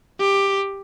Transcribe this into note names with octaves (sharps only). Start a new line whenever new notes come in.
G4